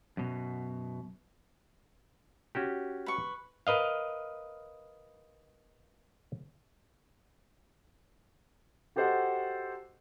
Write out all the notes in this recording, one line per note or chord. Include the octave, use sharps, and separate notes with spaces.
F#2 B2
C#4 F#4 G4
B4 C#6
A#4 B4 D#5 F5
F#4 G4 A4 C5 D#5 F#5